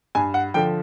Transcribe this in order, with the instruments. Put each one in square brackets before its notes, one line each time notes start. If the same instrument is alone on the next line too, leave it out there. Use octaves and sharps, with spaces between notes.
[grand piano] G2 G#5
F#5
D3 F3 G5